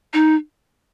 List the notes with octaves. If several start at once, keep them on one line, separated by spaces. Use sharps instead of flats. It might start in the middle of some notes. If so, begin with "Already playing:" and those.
D#4